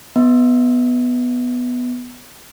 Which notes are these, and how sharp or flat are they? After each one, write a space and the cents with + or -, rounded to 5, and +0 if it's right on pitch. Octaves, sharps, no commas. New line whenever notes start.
B3 +0 E5 -45